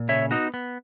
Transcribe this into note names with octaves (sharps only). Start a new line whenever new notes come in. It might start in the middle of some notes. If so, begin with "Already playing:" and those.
Already playing: A#2
C#3 C#5 E5
B3 D#4 F#4
B3